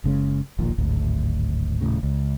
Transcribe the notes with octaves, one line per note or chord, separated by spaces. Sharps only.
F#1 C#3 G#3 C#4
E1 A#1 D#2 A#2
D1 G#1 D2
D#1 G#1 A2 C#3
C#2